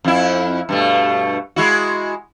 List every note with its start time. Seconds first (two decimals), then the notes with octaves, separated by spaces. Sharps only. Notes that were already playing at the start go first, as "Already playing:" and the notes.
0.04 F2 E4
0.69 G2 B2 A3
1.56 G#3 E4 F#4